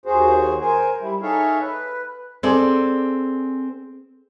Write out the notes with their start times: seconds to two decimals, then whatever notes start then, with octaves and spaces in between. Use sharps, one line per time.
0.06 D#2 F#4 G#4 C5
0.61 A#4 C5 G#5
1.01 G3 E4
1.22 D#4 G#4 A4 C#5 E5 F5
1.60 B4
2.43 C4 G#4 A4 D5